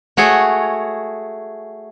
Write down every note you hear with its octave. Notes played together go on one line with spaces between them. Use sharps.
A3 F#4 G#4 C#5